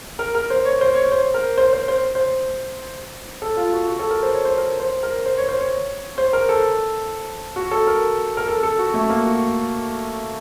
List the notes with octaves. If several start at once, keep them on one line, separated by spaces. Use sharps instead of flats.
A#4
A#4
C5
C#5
C5
C#5
C5
A#4
C5
C5
C5
C5
A4
F4
F#4
F#4
A4
A#4
C5
C#5
C5
A#4
C5
A#4
C5
C#5
C5
C#5
C5
A#4
A4
F#4
A4
A#4
A#4
A4
A4
F#4
A3
A#3
F#4